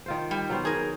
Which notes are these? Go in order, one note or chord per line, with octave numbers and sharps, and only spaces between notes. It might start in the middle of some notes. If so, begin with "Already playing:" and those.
D#3 F4 C5
G3
F#3 B3 C5
G#4 A#4